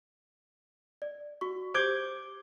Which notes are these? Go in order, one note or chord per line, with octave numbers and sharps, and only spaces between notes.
D5
F#4 C#6
G4 C5 D6 G6 G#6